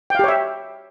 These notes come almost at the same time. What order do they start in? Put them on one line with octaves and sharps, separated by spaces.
G5 F5 G4 C#5 E5